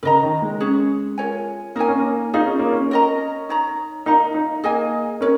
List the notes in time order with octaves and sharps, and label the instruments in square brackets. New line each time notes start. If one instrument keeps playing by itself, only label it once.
[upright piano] C#3 [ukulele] A#4 D#5 A#5
[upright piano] D#3
G#3
[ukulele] C#4 G#4 C#5
F4 A#4 C#5 G#5
[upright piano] A#3 [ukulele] D#4 A#4 C#5 G#5
[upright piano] C#4
A#3
[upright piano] D#4 [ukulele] F4 G#4 F5
[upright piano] C#4
A#3
C#4
[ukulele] A#4 D#5 A#5
D#4 C#5 A#5
[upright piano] D#4 [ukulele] A#4 F5 A#5
[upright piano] D#4
[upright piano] A#3 [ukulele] G#4 D#5 G#5
[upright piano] C#4 [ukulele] A#4 C#5